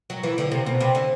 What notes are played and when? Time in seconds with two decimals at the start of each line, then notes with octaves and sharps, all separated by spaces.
0.10 F#3
0.23 E3
0.38 D3
0.52 C3
0.66 B2
0.80 C3
0.95 D3